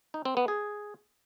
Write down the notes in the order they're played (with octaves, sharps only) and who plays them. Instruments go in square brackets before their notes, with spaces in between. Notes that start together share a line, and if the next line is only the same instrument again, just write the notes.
[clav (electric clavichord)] D#4
C4
B3
G#4